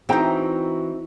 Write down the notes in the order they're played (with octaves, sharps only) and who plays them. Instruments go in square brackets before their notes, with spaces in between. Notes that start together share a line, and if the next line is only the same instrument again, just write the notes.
[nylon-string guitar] E3 [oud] C4 D#4 [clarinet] F#4 [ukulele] G#4 G5 A#5